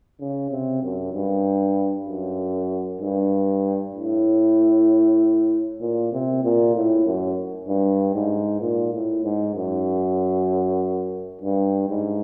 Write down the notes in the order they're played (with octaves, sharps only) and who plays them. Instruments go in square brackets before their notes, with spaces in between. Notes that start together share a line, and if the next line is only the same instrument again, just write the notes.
[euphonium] C#3
C3
F#2
G2
F#2
G2
A2
A#2
C3
A#2
A2
F#2
G2
G#2
A#2
A2
G#2
F#2
G2
G#2